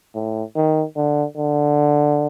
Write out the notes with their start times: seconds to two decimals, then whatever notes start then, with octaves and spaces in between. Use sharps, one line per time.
0.15 A2
0.56 D#3
0.96 D3
1.37 D3